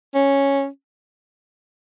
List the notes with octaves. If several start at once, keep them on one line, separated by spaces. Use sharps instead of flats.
C#4